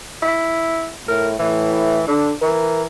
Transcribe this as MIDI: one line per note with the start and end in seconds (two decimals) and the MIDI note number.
0.22 0.91 64
1.08 1.37 45
1.08 1.28 70
1.39 2.02 45
1.39 2.04 52
2.08 2.31 50
2.08 2.33 62
2.42 2.87 52
2.42 2.83 70